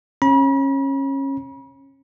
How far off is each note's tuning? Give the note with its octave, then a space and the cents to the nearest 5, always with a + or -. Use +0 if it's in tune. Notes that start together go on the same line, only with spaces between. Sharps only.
C#4 -25 B5 -45